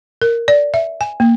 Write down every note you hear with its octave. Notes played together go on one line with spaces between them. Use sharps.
A#4
D5
E5
G#5
A#3